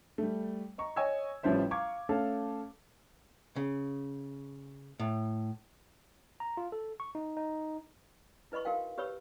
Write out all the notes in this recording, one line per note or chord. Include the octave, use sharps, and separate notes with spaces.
G3 A3
D#5 A#5 C#6
C#5 D#5 G#5 C#6 E6 G#6
A1 F3 G3 C#4 C5 E5
F5 A#5 C#6 D6 G#6
A3 C#4 A4 F5 A5
C#3
A2
A#5
F4
A4
C#6
D#4
D#4
E4 B4 D#5 B5 C#6
D#4 F#4 A#4 F5 G5
G4 B4 C#5 B5 E6